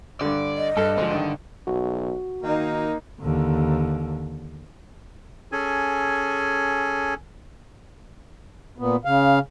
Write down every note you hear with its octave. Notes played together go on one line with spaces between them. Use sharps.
G2 D3 D5
D#5
G2 A4
G#2 D3 F3
G2 D#3
B1 F#4
D#3 A#3 D#4
D#2 D3
C#4 G#4 A4 G#5
A#2 B3
C#3 F5